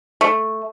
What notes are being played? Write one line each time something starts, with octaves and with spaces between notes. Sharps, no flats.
A3